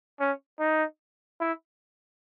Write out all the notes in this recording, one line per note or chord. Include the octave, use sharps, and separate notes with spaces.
C#4
D#4
E4